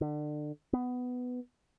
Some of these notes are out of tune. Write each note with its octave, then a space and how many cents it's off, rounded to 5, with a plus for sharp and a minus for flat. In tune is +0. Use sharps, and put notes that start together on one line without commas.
D3 +30
B3 +10